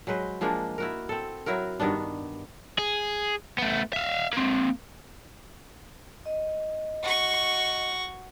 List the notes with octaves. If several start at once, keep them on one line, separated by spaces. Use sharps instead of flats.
F#3 G#3 B4 C5
F3 G#3 A#3 D4
E4 F#4 A#4
C4 A4
F#3 E4 F#4 A#4
G2 D#3 B3 D4
G#4
A3 B3
E5 F5
A#3 C4
D#5
F#4 C#6